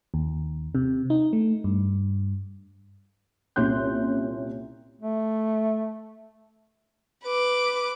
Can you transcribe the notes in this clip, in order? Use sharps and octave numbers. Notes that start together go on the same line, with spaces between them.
D#2
C3
D#4
A3
G2
C2 A#2 C#4 C6 F#6 G6
A3
B4 D6